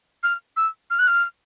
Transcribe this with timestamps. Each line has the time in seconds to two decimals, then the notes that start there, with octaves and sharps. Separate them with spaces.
0.23 F6
0.56 E6
0.90 F6
0.99 F#6
1.07 F6